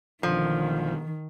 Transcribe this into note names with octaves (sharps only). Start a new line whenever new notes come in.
B1 D3 D#3 F3